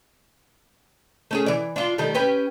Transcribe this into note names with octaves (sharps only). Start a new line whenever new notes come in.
A3 C#4 G#4
E3 D5
D4 F4
D#3 G3 A3
C#4 G4 B4